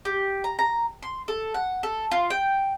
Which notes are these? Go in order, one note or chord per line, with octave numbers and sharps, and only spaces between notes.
G4
A#5
A#5
C6
A4
F#5
A4
F4
G5